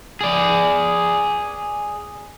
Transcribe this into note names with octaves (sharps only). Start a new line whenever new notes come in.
G#4 D5